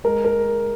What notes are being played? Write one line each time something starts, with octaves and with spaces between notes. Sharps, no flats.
G#3 A#4
A#4